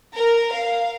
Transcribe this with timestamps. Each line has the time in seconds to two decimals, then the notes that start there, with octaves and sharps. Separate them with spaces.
0.15 A#4
0.53 F5